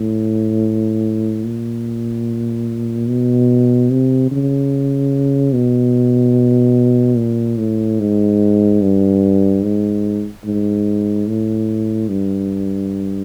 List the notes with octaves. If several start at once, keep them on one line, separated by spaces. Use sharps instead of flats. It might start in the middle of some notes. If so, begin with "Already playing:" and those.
Already playing: A2
A#2
B2
C3
C#3
B2
A#2
A2
G#2
G2
G#2
G#2
A2
G2